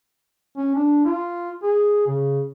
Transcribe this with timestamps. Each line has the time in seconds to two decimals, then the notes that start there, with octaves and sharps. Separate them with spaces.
0.57 C#4
0.75 D4
1.05 F4
1.63 G#4
2.07 C#3